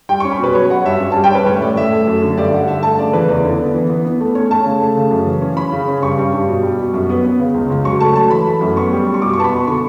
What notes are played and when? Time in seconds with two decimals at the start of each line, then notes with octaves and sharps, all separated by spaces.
0.09 G3 G5
0.20 C#6
0.25 C#4
0.32 B5
0.40 B2 B4
0.55 F#3 C#5
0.70 F#3 F#5
0.85 G2 E5
1.00 C#4 C#5
1.12 A5
1.16 G3
1.24 G5
1.31 C#4 B4
1.46 A2 C#5
1.57 E5
1.61 A2 D5
1.76 A2 E5
1.92 A3
2.07 F#2
2.22 D3
2.37 G2 D5
2.53 G2 F#5
2.68 D3 E5
2.83 A3 A5
2.98 C#3 D5
3.13 E3 B4
3.28 E2 D5
3.44 D3
3.60 B3
3.75 E3
3.90 B3
4.05 B3
4.20 A3
4.35 C#4 C#5
4.50 A3 A5
4.66 C#3
4.81 A3
4.97 C#3
5.11 F#2
5.26 E3
5.41 C#4
5.56 C#4 B5
5.72 C#3
5.88 C#4
6.02 G2 C#6
6.18 G2
6.33 G2
6.48 B2
6.63 G3
6.78 B2
6.94 F#2
7.10 B3
7.25 B3
7.39 C#3
7.54 C#2
7.70 C#2
7.85 F#3 C#6
8.00 A3 A5
8.15 F#3 A5
8.31 E3 B5
8.46 A3
8.61 F#2
8.76 B3 C#6
8.91 G3
9.06 G3
9.14 C#6
9.22 B2 D6
9.33 C#6
9.37 B3 A5
9.44 B5
9.53 B2 C#6
9.67 D3 C#6